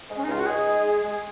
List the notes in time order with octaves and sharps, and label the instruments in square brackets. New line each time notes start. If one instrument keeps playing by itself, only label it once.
[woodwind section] G#3
[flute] C#4
D#4
[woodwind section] C#2 [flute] F4
[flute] F#4
[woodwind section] D#4 [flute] G#4
[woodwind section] G#3
G#3
G#3
[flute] G#4